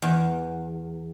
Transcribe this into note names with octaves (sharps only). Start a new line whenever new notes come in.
E2